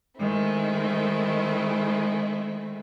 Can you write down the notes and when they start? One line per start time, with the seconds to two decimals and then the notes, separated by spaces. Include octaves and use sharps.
0.17 D#3 G#3 A3 C4 E4